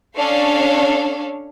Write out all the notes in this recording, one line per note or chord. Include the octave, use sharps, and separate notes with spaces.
C#4 D4 A4 C#5 F5